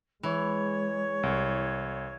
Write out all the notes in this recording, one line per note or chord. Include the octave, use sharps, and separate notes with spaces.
E3 G#3 C#5
C2